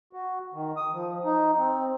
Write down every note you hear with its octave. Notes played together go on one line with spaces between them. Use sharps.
F#4
D#3
D#6
F3
D#4
C4